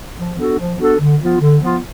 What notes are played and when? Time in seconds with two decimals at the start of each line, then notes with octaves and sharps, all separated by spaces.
0.19 F3
0.39 B3 D4 F#4 A4
0.59 F3
0.79 B3 D4 F#4 A4
1.00 D3
1.21 F3 B3 F4
1.41 D3
1.61 F3 B3 F4